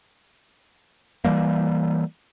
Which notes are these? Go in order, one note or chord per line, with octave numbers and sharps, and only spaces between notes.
E3 F3 G3 A#3